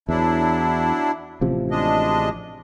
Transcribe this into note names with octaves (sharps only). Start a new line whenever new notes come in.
E2 F#3 D4 E4
A1 C3 F3
G#3 D4 D#5